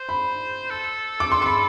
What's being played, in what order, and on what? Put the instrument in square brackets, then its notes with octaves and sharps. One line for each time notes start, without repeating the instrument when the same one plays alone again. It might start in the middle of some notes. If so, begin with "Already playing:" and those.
Already playing: [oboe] C5
[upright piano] B5
[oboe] A4
[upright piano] D6
C6
C6
B5